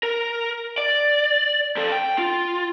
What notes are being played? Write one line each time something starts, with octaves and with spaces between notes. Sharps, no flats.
A#4
D5
F3 A4
G5
F4